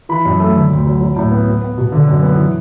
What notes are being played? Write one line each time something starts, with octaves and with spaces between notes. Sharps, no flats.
E3 B5
F#2
A3
D3
D2
F#3
F#3
A2
B3
B3
B3
B2
D3
F#2
B3
E3